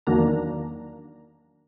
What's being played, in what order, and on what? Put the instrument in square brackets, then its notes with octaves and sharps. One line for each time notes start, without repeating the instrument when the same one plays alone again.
[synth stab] E2 D#3 F#3 A#3 D4 A#5